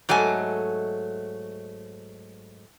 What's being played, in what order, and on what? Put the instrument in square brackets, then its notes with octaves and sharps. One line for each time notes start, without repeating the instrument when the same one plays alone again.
[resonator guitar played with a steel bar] G#2 F#3 A3 D#5 G#5